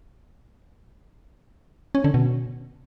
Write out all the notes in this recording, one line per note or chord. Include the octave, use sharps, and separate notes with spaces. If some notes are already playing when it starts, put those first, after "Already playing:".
C#4
D3
B2